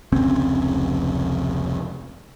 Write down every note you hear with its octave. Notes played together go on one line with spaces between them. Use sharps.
F1 C#2 C4 C#4